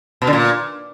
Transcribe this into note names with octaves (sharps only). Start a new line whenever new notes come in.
B2
D3
A#2